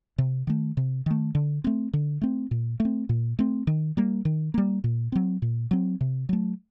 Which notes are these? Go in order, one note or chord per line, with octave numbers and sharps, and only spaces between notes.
C3
D#3 A3
C3
D#3 A3
D3
A3 C4
D3
A3 C4
A#2
A3
C4
A#2
A3 C4
D#3
G3 A#3
D#3
G3 A#3
A#2
F#3 C4
A#2
F#3 C4
C3
F#3 A3